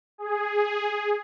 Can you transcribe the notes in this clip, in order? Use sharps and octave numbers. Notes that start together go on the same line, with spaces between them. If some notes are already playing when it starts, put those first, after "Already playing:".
G#4